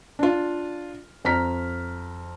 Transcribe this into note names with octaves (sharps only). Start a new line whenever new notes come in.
D4 F4
F2 A#5 F6 B6